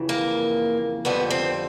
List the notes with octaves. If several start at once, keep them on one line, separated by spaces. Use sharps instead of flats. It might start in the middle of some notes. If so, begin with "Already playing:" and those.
Already playing: F2 C#3 E3
A#3
F2 D3 G3 B3
C4